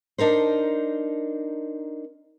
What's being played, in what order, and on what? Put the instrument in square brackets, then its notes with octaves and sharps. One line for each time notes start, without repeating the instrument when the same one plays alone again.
[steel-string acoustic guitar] D4 D#4 A#4 C5